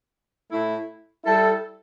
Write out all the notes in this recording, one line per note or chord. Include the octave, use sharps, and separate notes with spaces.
A2 A3 E4
G3 E4 A4